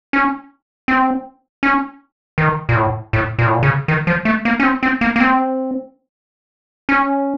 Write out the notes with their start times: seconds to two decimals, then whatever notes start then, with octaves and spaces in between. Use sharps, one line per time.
0.13 C#4
0.88 C4
1.63 C#4
2.38 D#3
2.69 A#2
2.76 A2
3.13 A2
3.39 A#2
3.46 A2
3.54 A#2
3.63 C#3
3.88 D#3
4.07 F3
4.25 A3
4.45 A#3
4.60 C#4
4.63 C4
4.83 C4
5.01 A#3
5.16 A#3
5.20 C4
6.89 C#4